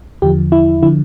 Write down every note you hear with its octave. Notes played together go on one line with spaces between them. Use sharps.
E2 D3 F3 G4
E4
D3 F3 E4